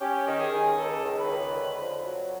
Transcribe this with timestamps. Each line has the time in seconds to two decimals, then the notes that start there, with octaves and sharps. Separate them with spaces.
0.01 C#4 G4
0.27 D#3
0.40 G#4
0.53 D#3
0.78 C#2 A4
1.03 D#3
1.16 B4
1.29 C#2
1.54 D3
1.79 F2
2.05 F#3